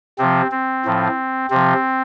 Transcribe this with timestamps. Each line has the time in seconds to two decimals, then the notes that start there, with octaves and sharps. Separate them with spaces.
0.18 C3 F3 C4
0.51 C4
0.85 A2 F3
1.50 C3 F3 C4